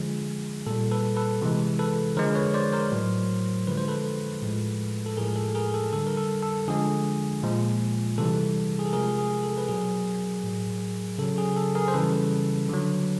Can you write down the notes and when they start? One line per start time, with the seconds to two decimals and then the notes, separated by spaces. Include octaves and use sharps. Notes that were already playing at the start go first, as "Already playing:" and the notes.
Already playing: D3 F3 G#3 G#4
0.67 A#2 G3 A4
0.91 A4 B4
1.17 A4 B4
1.42 C3 E3 G#3
1.79 A4 B4
2.17 D3 F3 G#3 A#4 C5
2.35 B4 C#5
2.54 C5 D5
2.73 A#4 C5
2.92 A2 F#3
3.67 D3 F3 G#3 B4
3.77 C5
3.88 A4 B4
4.42 A2 F3 G#3
5.06 A4
5.17 A2 F3 G#3 G#4 A#4
5.36 A4
5.55 G#4 A#4
5.74 A4
5.93 D3 G3 A4
6.07 A#4
6.17 A4
6.42 A4
6.68 D3 F3 G#3 G#4
7.43 A#2 F3 G#3
8.18 C3 E3 G3 A4
8.79 G#4
8.86 A4
8.93 C3 F3 G#3 G#4 A#4
9.18 G#4
9.43 A4
9.58 B4
9.68 B2 F#3 G#4 A#4
10.43 A2 F#3
11.18 C#3 F#3 A4
11.38 G#4
11.57 A4
11.75 G#4 A#4
11.88 C5
11.94 C#3 E3 G3 A4 B4
12.69 D3 F#3